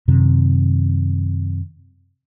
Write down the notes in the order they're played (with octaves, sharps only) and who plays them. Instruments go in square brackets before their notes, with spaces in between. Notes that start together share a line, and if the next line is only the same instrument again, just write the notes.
[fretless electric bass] F#2 C3 D#3